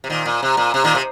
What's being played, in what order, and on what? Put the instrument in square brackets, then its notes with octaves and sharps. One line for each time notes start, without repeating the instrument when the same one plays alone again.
[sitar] C3
A#2 D#3
A#2
C3
A#2
C3
A#2 D#3
C3